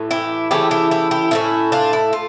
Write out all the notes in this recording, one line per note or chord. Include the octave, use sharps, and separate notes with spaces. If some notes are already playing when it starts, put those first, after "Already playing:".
Already playing: A2 E3
E4 G4
C#3 E3 A3 E4 G4
E4 G4
E4 G4
E4 G4
A2 E3 A3 C#4 E4
D4 F4
E4
F4